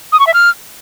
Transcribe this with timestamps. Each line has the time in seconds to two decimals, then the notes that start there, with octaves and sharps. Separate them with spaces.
0.12 D#6
0.20 C#6
0.27 E5
0.34 F6